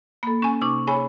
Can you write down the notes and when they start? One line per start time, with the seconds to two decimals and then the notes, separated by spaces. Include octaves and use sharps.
0.23 A#3 A4 B5
0.42 C#4 G#5 C#6
0.61 C3 D#4 C#6 D6
0.87 G#4 C#5 G#5 B5